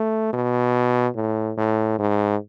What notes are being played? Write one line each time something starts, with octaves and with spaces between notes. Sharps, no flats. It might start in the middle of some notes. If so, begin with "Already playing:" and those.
Already playing: A3
B2
A2
A2
G#2